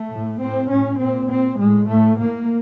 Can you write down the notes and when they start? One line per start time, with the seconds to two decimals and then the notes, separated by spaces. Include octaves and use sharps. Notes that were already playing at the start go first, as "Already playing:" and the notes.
Already playing: A3
0.11 A2
0.41 A2 C4
0.71 A2 C#4
1.01 A#2 C4
1.29 A#2 C4
1.60 A2 G#3
1.88 A2 A3
2.18 A2 A#3